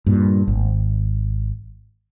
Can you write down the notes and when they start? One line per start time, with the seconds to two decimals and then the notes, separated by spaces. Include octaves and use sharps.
0.06 G2 A#2
0.48 G#1